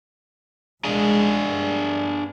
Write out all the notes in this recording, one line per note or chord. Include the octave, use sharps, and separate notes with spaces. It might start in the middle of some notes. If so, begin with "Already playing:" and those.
C2 G#3 D4 G#4
G2